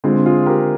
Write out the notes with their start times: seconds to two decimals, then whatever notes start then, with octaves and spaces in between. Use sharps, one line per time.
0.04 D3 G#3 C4 F4
0.26 F4 G#4
0.46 G4 A#4